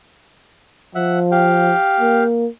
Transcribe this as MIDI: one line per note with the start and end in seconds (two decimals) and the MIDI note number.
0.95 1.73 53
0.95 1.19 76
0.95 1.19 78
1.32 2.24 67
1.32 2.24 77
1.32 2.24 79
2.00 2.48 58